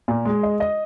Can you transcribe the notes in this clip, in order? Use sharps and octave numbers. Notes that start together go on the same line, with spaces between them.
A#2
G#3
D#5
D#5